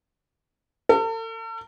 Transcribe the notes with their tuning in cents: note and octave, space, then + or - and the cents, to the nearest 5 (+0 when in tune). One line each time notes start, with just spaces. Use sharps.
A4 +40